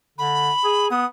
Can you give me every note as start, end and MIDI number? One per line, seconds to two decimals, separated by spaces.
0.18 0.51 50
0.18 0.88 83
0.64 0.88 68
0.91 1.06 59
0.91 1.06 87